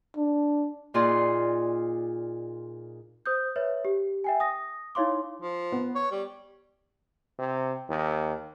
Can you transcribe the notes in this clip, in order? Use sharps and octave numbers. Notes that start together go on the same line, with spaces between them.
D4
A#2 D#4 F4 G#4 D5 C6
C5 D#6 G6
B4 C#5 E5
G4
E5 G5 G#5
D#6 A#6
D#4 E4 C#5 F5 C6 D6
F3
B3
C#5
G3
C3
D#2